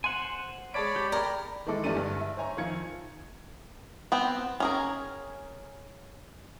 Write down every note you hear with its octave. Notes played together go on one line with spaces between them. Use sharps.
C5 F#5 G#5 C6
G#3 C#5 D5 A5 B5 D7
G4
A#4 D5 G5 B5
D#3 E3 G#3 E4 A4 D6
E2 G2 G3 A3 D4 D#7
G2 D3
E5
C5 C#5 E5 G#5 A#5 C#6
F2 D#3 F5 G#6 C#7
B3 C4
C#4 G#4 A#4